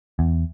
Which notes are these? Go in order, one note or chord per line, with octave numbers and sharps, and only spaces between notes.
E2